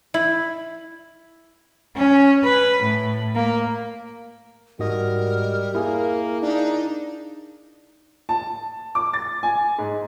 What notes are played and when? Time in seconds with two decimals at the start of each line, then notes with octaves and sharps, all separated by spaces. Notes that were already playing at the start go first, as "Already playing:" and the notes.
0.14 E4
1.96 C#4
2.44 B4
2.83 A2
3.35 A#3
4.79 G#2 G3 F#4 A#4 D#5
5.75 A#3 E4 G#4
6.42 D4 D#4
8.29 A5
8.95 D6
9.13 A6
9.43 G#5
9.79 G#2